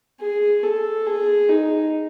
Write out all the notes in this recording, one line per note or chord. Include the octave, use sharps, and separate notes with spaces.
G#4
A4
G#4
D#4